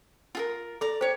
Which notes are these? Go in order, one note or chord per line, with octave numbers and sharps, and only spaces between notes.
F4 G#4 A#4
A4 D5 A#5
G4 C5 C#5